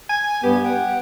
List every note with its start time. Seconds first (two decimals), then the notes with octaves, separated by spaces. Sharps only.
0.09 G#5
0.43 G2 B3 G4
0.65 F#5 G5